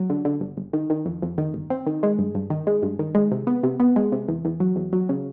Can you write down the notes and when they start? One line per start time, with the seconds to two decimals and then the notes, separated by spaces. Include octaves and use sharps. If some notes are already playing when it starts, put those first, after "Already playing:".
Already playing: F#3
0.10 D3
0.25 D3
0.41 G1
0.57 G1
0.73 D#3
0.90 D#3
1.06 F2
1.22 F2
1.38 D#3
1.54 G1
1.70 C4
1.87 D#3
2.03 G#3
2.19 G2
2.35 G2
2.50 D#3
2.67 G#3
2.83 G2
2.99 D#3
3.15 G#3
3.31 C3
3.47 B3
3.63 C3
3.80 B3
3.96 G#3
4.12 C3
4.28 E2
4.45 E2
4.60 F#3
4.76 E2
4.93 F#3
5.09 C#3